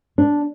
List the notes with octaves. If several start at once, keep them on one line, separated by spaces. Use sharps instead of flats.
D4